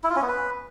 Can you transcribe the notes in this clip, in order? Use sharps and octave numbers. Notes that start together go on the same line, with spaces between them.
E4
F4
C#4
B3
B4